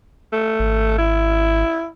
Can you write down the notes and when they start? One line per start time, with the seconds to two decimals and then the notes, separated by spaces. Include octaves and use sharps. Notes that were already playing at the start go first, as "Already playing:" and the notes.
0.33 A3
0.59 G#1
0.99 E4